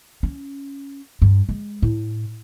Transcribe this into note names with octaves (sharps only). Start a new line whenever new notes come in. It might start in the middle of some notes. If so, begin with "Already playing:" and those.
C#4
G2
G#3
A2